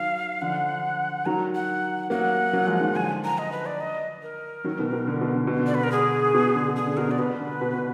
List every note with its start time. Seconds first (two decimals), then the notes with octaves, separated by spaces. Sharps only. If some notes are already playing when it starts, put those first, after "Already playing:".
Already playing: D#3 F#3 F5
0.41 D3 F3 F#5
1.26 D#3 F#3 A#5
1.55 F#5
2.10 F#3 A#3 F#5
2.53 F#3 A#3
2.67 F3 G#3
2.81 D#3 F#3
2.96 D3 F3 G#5
3.24 A#5
3.38 D#5
3.52 B4
3.66 D5
3.80 D#5
4.22 A#4
4.64 D#3 F#3
4.79 B2 D#3
4.93 B2
5.07 D3
5.21 B2
5.35 D3
5.47 B2
5.58 D3
5.67 D5
5.74 B4
5.83 A#4
5.91 G#4
6.34 B2
6.55 D3
6.76 D3 G#4
6.87 D3
6.97 B2 A#4
7.08 D3
7.11 D5
7.18 B2 B4
7.40 D3
7.61 B2
7.74 B2